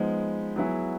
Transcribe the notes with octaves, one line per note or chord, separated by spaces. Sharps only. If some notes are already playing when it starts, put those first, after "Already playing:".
Already playing: F3 G#3 B3 D#4
F#3 B3 E4 G#4